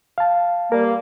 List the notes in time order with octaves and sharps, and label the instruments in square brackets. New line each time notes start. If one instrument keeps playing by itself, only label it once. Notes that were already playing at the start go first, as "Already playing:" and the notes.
[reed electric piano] F5 A5
[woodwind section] G3 A#3 [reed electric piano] A#4